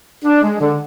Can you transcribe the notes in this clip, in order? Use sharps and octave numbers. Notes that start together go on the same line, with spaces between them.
D4
G#3
D3